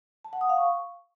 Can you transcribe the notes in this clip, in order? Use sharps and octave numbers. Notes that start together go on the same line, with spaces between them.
A5
F#5
D#6
F5
C#6